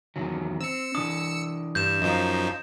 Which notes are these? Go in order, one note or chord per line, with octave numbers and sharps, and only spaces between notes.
E2 D#3 F#3
C4 E6 C#7
E3 D4 D#6
G2 G6 E7
F#2 F3 D#4 D#5 F5